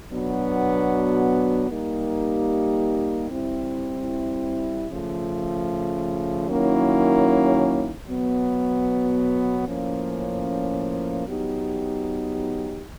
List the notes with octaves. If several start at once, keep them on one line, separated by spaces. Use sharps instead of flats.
B2 F#3 B3 D4 F#4
G3 A#3 D#4 G4 A#4
G3 C4 E4
C#3 F3 A3
D#3 F#3 A#3 C#4 E4
B2 F#3 B3
A2 F3 A#3 C#4
F#3 B3 D#4 G4